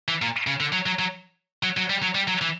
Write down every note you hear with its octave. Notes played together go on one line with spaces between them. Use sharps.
E3
A#2
C#3
D3
F#3
F#3
F#3
F#3
F#3
G3
F#3
G3
F#3
E3